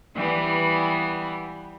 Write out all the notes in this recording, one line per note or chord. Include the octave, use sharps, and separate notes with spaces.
E3 G3 B3